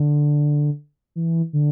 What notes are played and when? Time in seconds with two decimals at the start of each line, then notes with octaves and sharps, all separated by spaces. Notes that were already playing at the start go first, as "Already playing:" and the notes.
Already playing: D3
1.16 E3
1.53 D3